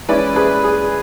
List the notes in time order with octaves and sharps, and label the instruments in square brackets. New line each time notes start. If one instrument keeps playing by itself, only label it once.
[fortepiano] E3 G#3 C#4 E4 B4 D5
G#4 B4
G#4